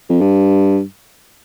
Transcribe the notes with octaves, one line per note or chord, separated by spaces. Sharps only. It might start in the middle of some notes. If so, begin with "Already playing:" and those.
F2
G2